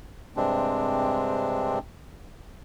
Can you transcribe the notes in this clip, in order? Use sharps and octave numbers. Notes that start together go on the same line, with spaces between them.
G2 C3 G#3 C4 D4